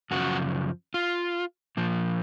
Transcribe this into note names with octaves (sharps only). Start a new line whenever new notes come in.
F#2 C#3 F3 F#4
F4
A#2 F3